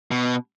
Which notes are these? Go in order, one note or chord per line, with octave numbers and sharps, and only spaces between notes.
B2